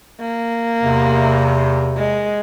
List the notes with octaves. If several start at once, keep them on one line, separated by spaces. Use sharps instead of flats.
A#3
E2 C3
G#3